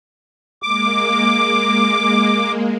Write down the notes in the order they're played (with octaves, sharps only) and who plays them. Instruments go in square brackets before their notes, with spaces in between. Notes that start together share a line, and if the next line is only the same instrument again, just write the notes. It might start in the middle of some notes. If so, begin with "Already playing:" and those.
[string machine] G#3 A#3 [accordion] D6